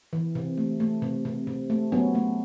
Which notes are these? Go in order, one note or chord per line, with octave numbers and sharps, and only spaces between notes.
E3
C3
A3
A3
C3
C3
C3
A3
F#3 B3 C#4
A3